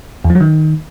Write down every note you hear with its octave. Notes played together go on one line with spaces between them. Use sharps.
E2
F3
F#3
D#3